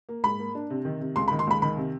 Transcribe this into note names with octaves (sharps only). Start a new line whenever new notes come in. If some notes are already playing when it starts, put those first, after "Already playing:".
A#3
G#2 B5
A#3
D4
C3
D#3
C3
C#2 C6
B5
D#3
C6
C#2 B5
D#3 B5
C3